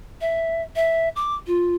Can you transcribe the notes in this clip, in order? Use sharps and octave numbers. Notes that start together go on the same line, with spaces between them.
E5
E5
D6
F4